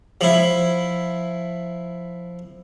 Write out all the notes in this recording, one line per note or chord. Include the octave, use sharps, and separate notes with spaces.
F3 E4